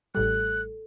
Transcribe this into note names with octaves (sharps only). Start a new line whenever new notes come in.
A1 A2 G3 A4 F#6